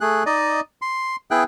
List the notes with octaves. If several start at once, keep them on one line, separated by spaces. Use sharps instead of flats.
A3 G#4 F#6
D#4 D5 D#5
C6
B3 E4 G#4 G5 F#6